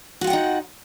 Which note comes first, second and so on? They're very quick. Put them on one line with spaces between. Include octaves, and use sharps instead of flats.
F#4 F4 G5 F#5 D#4